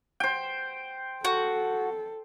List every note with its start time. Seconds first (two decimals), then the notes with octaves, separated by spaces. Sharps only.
0.20 C5 G5
1.25 F#4 A4